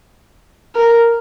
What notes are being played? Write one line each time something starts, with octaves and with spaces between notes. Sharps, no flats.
A#4